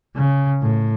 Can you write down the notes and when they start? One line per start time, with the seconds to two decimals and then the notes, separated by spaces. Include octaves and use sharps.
0.16 C#3
0.62 A2